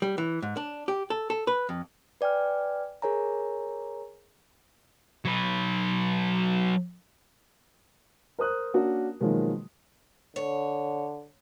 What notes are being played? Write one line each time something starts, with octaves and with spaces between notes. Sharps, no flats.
G3
E3
G#2
D4
G4
A4
A4
B4
F2
B4 D5 G5 G#5 F6
G#4 A#4 C#5 G#5 A#5
F#3 B4
A#4 C5 D#6 F#6
A#3 C#4 D4 F#4 A#4
B2 D#3 F3 F#3 G#3 A#3
D3 C#5